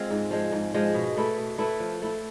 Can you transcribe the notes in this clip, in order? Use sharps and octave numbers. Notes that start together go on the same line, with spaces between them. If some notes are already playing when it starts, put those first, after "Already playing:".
Already playing: G#3 C4 F4
G#2
F3 G#3
G#2
F3 G#3
B2
A3 E4 B4
B2
A3 E4 B4
F3
A3 E4